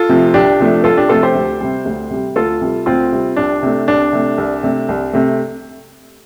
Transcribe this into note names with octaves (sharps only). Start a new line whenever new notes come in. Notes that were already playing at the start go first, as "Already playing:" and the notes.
Already playing: F4 A4
C3 F3 A3
C2 D4 G4
C3 F3 A3
C2 F4 A4
D4 G4
C3 F3 A3 F4 A4
G4 C5
D2
C3 G3
D2
C3 G3
D2 F4 A4
C3 G3
D2 C4 F4
C3 G3
C2 D4
C3 A3
C2 D4
C3 A3
C2
C3 A3
C2
C3 A3